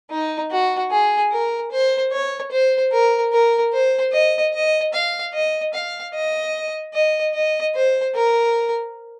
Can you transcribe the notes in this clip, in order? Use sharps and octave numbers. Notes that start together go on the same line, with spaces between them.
D#4
F#4
G#4
A#4
C5
C#5
C5
A#4
A#4
C5
D#5
D#5
F5
D#5
F5
D#5
D#5
D#5
C5
A#4